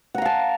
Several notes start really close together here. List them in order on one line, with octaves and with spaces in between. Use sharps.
F#5 A#5 F5 A5